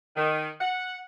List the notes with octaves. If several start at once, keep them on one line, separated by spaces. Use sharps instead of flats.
D#3
F#5